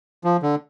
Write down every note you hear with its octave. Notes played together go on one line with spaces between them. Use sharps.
F3
D3